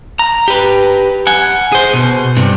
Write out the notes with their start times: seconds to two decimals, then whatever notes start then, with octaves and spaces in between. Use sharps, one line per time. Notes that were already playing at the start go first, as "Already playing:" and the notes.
0.19 A#5
0.48 G4 B4
1.27 F#5 G#5
1.72 G#4 C5
1.93 B2
2.37 G2 C3